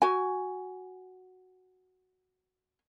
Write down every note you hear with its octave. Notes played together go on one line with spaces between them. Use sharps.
F#4 G#5